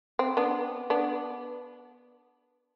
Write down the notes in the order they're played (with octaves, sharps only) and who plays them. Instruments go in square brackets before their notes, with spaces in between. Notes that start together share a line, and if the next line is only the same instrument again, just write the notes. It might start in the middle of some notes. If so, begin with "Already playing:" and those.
[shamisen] C4
B3 D4
B3 D4